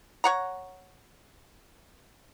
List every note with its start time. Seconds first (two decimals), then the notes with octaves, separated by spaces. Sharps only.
0.24 C#5 F#5 A#5